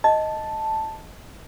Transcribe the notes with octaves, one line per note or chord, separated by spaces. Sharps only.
D#5 A5